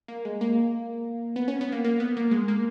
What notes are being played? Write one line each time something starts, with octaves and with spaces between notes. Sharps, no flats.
A#3
G#3
A#3
B3
C#4
B3
A#3
A#3
B3
A#3
G#3
A#3